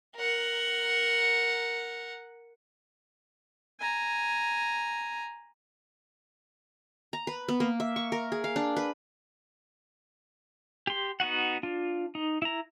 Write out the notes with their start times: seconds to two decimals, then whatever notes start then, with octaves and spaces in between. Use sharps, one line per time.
0.16 A#4 F#5
3.81 G#5 A#5
7.13 A#5
7.27 B4
7.48 B3
7.60 A#3
7.80 E5
7.96 C#6
8.12 A#4
8.32 G#4
8.44 F5
8.56 D4
8.76 B4
10.87 G4 C6
11.20 B3 D#4 F#4 F#5
11.63 D4 F4
12.15 D#4
12.42 E4 A#5